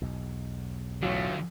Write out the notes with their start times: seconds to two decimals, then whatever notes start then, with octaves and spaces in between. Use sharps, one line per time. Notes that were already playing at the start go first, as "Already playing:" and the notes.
0.02 B1 E2 B2
1.03 A1 D3 F#3 A3 F4 C#5